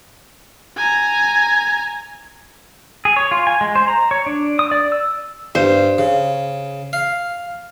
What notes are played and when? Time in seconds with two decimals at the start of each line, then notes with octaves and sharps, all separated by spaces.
0.76 G#5 A#5
3.05 G#4
3.16 C#5
3.31 F4
3.47 G#5
3.61 G#3
3.76 C5
3.88 A#5
4.11 C#5
4.26 D4
4.59 D#6
4.71 D5
4.92 E6
5.55 G2 C5
5.98 C#3
6.93 F5